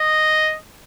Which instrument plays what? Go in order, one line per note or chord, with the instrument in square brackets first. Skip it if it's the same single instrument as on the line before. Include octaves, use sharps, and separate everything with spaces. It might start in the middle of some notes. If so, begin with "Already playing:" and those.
Already playing: [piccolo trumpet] D#5